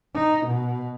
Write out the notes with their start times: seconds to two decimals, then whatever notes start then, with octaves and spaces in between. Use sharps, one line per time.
0.14 D#4
0.46 B2